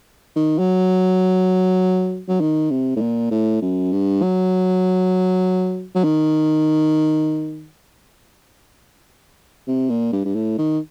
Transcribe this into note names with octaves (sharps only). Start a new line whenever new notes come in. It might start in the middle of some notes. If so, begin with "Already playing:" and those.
D#3
F#3
F#3
D#3
C3
A2
A#2
A2
F#2
G2
F#3
F#3
D#3
C3
A#2
G2
G2
A2
D#3